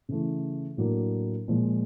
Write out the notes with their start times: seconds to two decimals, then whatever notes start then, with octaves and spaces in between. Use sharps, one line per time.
0.09 C#3 E3 A3
0.77 A2 F#3 A#3 D4
1.48 A#2 F3 G#3